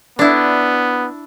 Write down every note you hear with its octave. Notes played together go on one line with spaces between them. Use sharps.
B3 D4 E4